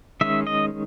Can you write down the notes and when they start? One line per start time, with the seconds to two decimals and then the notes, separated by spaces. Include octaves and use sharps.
0.21 D#3 G#3 C#4 E5
0.47 D#5